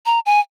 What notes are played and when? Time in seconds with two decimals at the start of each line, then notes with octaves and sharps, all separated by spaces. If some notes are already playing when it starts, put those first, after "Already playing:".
0.06 A#5
0.26 G#5